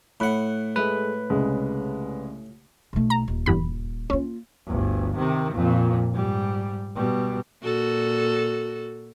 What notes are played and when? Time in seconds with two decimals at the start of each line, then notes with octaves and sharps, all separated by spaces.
0.20 A2 F#5 B5 F#6
0.76 G#3 A3 B4
1.30 C2 C#3 G#3
2.93 B1 A3
3.10 A#5
3.28 D#1
3.46 E2 G2 B5
4.10 A#3 C#4 F4
4.67 G1 D2
5.17 C3 D#3
5.54 F2 A#2
6.13 G#2 G3
6.95 B2 G3
7.63 A#2 F#4 A4